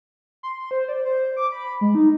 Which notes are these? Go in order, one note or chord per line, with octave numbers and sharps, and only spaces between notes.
C6
C5
D5
C5
D6
B5
G#3
D#4